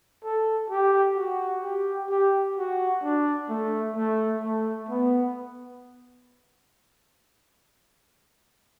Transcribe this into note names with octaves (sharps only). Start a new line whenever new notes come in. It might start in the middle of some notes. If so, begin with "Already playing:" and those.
A4
G4
F#4
G4
G4
F#4
D4
A3
A3
A3
B3